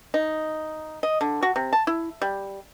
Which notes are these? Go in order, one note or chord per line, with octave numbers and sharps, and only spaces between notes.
D#4
D#5
D3
F#4
C3
A5
E4
G3